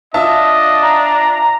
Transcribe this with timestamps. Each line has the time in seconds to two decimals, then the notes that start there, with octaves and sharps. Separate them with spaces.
0.14 D4 F4 D#5 E5 A5
0.82 A#5